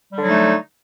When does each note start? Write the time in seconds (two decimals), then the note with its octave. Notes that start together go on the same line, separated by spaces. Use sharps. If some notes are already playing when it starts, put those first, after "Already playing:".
0.12 G3
0.17 D3
0.21 F#3
0.26 D#4
0.30 A3